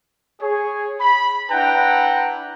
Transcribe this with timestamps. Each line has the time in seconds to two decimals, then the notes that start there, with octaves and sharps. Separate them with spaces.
0.40 G#4 C#5
1.01 B5
1.51 D4 E4 B4 F#5 G5 A#5